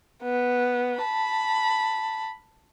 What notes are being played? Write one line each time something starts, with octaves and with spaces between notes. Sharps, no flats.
B3
A5 B5